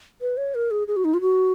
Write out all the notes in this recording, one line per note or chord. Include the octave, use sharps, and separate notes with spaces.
B4
C#5
A#4
G#4
G#4
F#4
D#4
F4
F#4